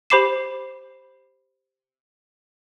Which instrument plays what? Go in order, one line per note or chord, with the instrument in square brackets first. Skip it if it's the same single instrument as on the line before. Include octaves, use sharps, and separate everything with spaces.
[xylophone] G4 C5 B5 D6 C7 E7